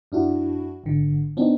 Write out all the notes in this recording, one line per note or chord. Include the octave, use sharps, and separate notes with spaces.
F#2 D4 E4 F#4
G#1 D3
B3 C4 D4 D#4